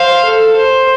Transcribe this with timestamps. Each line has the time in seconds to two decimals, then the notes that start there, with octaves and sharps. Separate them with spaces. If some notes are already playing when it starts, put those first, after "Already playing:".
Already playing: C5 F5
0.25 A4
0.56 C5